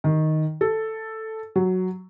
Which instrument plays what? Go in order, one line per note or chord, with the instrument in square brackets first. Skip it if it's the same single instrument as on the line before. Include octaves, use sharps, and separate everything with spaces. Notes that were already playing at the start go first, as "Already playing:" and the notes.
[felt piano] D#3
A4
F#3